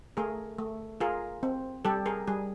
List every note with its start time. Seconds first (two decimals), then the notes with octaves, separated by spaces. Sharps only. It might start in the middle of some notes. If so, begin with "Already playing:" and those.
0.17 A3 G#4 A#4
0.59 A3
1.00 F4 G#4 A#4
1.43 C4
1.85 G3 G4 A4
2.06 G#4 A#4
2.27 G3 G#4